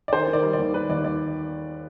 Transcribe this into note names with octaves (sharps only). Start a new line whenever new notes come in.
D5
D#3 C5
D#3
D5
G3
D5
D#2
D#3 B4
D#2 D5
D5